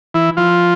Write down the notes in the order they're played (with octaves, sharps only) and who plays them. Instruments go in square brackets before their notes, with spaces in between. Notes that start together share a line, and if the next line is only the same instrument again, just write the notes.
[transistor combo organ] E3 E4
F3 F4